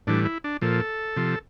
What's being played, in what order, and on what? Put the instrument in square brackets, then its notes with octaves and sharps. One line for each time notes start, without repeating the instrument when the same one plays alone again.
[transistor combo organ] A2 E3 G3 D4
E4
D4
A#2 F3 A4
C3 F3